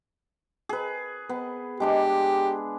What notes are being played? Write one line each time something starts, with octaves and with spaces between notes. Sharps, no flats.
G#4 B4
B3
G#3 D4 G4 B4